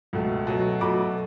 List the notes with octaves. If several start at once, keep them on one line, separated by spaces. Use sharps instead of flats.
C#2 B2 A3
B2 F#3 A3
B2 F#3 A3 B5 D6